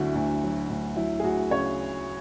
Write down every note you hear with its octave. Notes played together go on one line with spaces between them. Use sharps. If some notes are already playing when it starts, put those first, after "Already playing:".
Already playing: D2 D3 F#3 E4 F#4
D2
F#3
D2
F#3 E4
G#4
D2 F#4
C#3 C#5